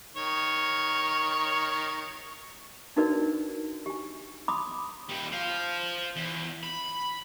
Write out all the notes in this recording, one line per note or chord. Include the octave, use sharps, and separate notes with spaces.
D#3 C#5
D4 D#4 F#4 A#4 B4 D5
G4 G#5
B5 C6 D6 D#6
D#2 G3
C5 F5
E2
B5